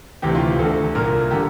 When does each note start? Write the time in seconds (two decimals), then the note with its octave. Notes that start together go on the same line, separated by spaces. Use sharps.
0.22 D2 C3 E3 G4
0.35 F4
0.47 G4
0.59 D2 D3 A4
0.95 C2 A#2 A#4
1.31 D3 G4